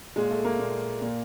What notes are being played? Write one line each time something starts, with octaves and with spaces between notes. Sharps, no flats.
A#2 G#3
A3
A#3
A#2
A#2